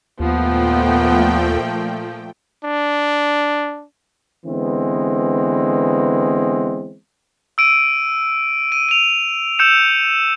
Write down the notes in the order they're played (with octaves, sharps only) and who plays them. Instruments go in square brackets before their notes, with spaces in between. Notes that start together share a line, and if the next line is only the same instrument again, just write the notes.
[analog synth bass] D#2 [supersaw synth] A#2 A3 G5 [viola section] F3 [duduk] B3
[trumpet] D4
[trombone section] D3 E3 G#3 B3 C4
[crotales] E6 D7 D#7
D#7
D#7 F7
E6 G6 C#7 E7